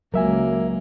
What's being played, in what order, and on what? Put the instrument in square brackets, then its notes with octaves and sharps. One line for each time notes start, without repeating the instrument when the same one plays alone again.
[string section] C#2 [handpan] F#3 [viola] A#3 [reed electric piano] A#4 E5 G#5